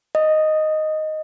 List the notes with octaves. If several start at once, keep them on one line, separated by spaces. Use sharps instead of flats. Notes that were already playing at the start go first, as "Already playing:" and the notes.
D#5